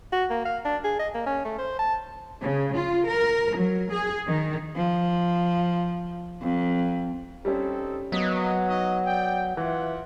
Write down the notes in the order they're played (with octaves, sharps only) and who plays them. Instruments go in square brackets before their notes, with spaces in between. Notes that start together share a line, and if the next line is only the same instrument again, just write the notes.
[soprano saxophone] F#4
A#3
F5
D4
G#4
D#5
A#3
C#4
A3
C5
A5
[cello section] C#3
F4
A#4
F#3
G#4
D#3
[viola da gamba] F3
F2
[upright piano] G3 C#4 [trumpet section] C4 D#4 A4
[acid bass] F#3 [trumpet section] A#3 D#5 [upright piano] B3 B4 B6
[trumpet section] D#4 F#4 D#5
D5 G5
[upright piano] E3 [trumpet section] F4 E5 F#5